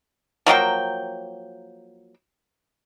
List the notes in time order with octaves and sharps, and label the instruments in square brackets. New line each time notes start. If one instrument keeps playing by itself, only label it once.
[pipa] F3 F#3 A#3 G5